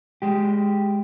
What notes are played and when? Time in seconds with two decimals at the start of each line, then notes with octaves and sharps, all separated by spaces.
0.22 G#3 G4